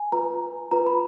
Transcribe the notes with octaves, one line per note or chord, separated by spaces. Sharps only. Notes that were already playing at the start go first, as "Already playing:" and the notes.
Already playing: G#5
F4 B4 A#5
F4 B4 A#5
B5